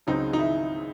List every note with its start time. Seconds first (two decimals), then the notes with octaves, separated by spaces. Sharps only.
0.07 C#2 C#3 F#3 C4 D#4
0.33 D#4
0.39 E4